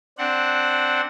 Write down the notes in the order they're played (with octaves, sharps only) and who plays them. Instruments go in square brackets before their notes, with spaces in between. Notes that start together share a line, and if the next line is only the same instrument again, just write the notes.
[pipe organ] C4 D4 F#5